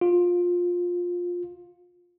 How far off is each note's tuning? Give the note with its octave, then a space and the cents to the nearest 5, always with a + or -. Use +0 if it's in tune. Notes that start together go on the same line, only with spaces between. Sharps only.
F4 +15